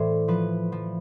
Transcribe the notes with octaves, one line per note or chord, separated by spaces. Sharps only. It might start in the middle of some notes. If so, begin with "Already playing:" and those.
Already playing: A2 E3 C5 D5
F3 B4
F3